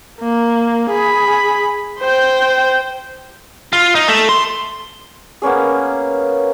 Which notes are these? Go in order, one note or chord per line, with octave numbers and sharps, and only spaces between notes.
A#3
G#4 B5
C5 G5
F4
D#4
A3
C6
A#3 B3 C#4 G#4